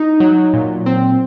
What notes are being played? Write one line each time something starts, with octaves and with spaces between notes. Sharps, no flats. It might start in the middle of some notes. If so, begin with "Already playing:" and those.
Already playing: D#4
F#3
A#2
C4